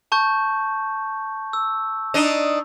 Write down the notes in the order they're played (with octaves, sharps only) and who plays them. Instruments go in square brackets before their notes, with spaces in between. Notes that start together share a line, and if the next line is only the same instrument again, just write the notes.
[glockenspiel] A5 C#6 G6
E6
[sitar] D4 D#4 D#5